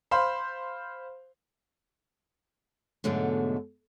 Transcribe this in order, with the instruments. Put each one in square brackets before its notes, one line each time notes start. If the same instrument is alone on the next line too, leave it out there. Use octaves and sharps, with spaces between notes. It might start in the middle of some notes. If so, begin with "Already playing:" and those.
[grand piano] C5 F5 B5 C6
[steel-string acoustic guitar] G#2 B2 D3 F#3 G#3 A3